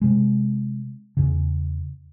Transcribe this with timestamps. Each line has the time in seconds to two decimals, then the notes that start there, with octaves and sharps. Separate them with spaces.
0.01 C3 G#3
1.17 E2 C#3